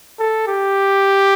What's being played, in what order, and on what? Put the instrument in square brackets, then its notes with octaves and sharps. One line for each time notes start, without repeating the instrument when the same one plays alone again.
[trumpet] A4
G4